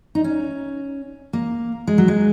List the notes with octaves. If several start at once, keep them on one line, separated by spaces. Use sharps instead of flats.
D#4
C#4
A#3
G#3
F#3
G#3